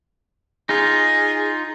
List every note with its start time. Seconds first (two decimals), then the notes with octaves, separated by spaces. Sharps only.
0.69 D#4 F4 G#4